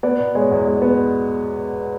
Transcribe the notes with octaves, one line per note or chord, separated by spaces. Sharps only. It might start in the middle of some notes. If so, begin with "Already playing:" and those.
B3 D5
B2
G#3 C#5
E2
G#3
B3